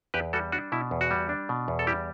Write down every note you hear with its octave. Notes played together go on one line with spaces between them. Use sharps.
E2 G4 B4
G3 F#4 A4
D4 F#4
B2 E4
E2
F#4
G3
D4
B2
E2
A4
G3 E4 G4